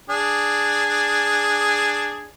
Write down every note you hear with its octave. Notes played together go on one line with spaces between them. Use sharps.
D4 G#4